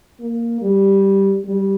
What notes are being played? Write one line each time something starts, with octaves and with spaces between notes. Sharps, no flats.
A#3
G3
G3